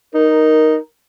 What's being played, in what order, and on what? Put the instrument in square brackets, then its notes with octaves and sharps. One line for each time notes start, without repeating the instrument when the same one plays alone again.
[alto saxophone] D#4 [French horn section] A#4